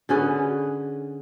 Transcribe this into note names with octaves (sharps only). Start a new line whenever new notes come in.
D3 C#4 G#4 B4